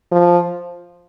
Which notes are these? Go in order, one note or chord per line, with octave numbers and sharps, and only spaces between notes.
F3